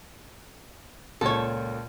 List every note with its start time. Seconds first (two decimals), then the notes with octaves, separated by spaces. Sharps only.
1.21 C#2 A#2 A4 C#5